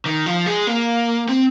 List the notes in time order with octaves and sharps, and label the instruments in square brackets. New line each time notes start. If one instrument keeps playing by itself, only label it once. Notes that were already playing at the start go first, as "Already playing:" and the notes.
[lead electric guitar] D#3
F3
G#3
A#3
C4